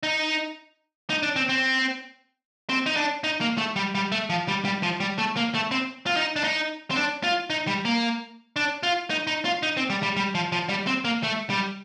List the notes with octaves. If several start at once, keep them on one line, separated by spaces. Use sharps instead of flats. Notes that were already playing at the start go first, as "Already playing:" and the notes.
D#4
D#4
D4
C4
C4
C4
D#4
D4
D#4
A#3
A3
G3
G3
A3
F3
G3
G3
F3
G3
A3
A#3
A3
C4
F4
D#4
D4
D#4
C4
D4
F4
D#4
G3
A#3
D4
F4
D#4
D#4
F4
D#4
C4
G3
G3
G3
F3
F3
G3
C4
A#3
A3
G3